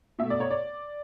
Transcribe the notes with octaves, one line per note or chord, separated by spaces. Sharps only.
B2 A3 E5
D5
C#5
D5